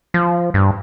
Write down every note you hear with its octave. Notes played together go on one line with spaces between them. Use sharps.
F3
G2